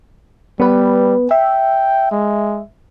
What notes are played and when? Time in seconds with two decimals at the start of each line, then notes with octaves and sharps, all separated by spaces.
0.60 G3 B3 B4
1.31 E5 G5
2.12 G#3